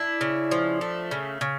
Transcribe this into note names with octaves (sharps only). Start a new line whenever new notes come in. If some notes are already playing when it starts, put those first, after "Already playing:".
Already playing: D4 E4
C#3
F3
A3
C#3
C#3